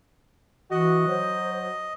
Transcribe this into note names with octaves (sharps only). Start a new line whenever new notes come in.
E3 F#4 D#5
F#3 C5